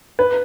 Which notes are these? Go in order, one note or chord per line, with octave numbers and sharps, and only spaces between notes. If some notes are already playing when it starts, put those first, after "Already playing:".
B4